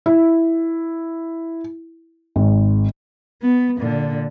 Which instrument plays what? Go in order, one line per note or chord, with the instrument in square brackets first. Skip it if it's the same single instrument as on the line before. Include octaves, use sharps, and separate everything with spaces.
[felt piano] E4
G#1
[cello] B3
A#2 D3